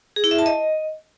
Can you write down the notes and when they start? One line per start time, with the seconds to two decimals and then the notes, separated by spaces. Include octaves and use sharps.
0.16 G#4
0.24 E4
0.31 E5
0.39 A5
0.46 D#5